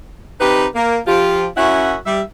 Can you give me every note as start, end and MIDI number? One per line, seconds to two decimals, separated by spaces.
0.40 0.65 48
0.40 0.65 63
0.40 0.65 67
0.40 0.65 71
0.75 0.98 58
1.07 1.45 53
1.07 1.45 65
1.07 1.45 67
1.57 1.95 42
1.57 1.95 61
1.57 1.95 64
1.57 1.95 66
1.57 1.95 76
1.57 1.95 78
2.06 2.22 55
2.06 2.22 76